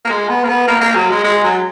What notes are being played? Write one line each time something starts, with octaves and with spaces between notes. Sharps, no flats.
A#3
G#3
B3
A#3
B3
A#3
A#3
F#3
G#3
G#3
F#3